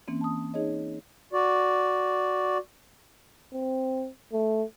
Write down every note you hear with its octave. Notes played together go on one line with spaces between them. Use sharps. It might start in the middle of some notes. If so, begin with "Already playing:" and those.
E3 A#3 C4 C#4
A5 D#6
D#4 G#4 C#5 D#5
F#4 D5
C4
A3